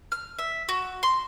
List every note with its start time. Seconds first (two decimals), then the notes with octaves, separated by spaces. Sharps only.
0.12 F6
0.39 E5
0.69 F#4
1.03 C6